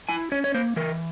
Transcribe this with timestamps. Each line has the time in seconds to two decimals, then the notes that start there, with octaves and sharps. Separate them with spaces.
0.09 E4 G#5
0.32 C#4 C#5
0.44 C#5
0.54 A#3 C5
0.76 E3 A#4